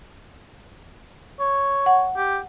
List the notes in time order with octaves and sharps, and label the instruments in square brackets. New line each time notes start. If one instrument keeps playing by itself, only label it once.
[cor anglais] C#5
[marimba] F#5
[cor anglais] G4